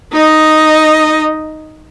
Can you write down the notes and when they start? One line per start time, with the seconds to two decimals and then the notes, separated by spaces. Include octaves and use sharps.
0.13 D#4 D#5